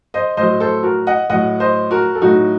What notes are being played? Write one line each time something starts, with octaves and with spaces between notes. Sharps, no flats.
C5 D#5
A2 F#3 C5 D#5
A4 C5
F#4 A#4
D#5 F#5
A2 F#3 D#5 F#5
C5 D#5
F#4 A#4
A4
A2 F#3 D#4 F#4